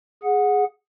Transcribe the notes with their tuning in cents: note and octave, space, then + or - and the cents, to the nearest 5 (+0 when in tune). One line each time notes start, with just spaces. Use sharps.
G#4 +0 F#5 -15